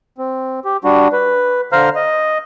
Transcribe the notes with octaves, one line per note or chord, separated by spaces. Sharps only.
C4
G4
G3 D4 F#4
B4
D3 C5 F5 A#5 F6
D#5